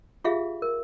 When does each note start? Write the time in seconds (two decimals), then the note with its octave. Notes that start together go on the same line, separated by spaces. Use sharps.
0.24 F4 G4 G#4 E5 F5
0.62 A#4